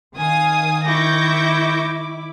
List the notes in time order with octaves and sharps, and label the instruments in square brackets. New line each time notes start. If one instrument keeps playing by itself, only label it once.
[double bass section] D#3 [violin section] F5 G#5 D#6
[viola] E4 D6 [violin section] C#6 G6 A#6